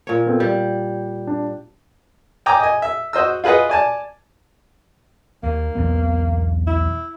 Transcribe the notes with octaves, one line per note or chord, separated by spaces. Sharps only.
A#2 C#5
B3 C4 A4
G3 G6
D4
G5 G#5 A#5 D6
D#5 G#5
E5
F#4 C5 D#5 E6
F4 G#4 B4 D#5 F#5
D5 G#5 A5
D#2 A#3
B1 E2 B3
E4